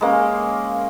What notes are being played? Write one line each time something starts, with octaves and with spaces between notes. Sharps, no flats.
G#3 A#3 C#4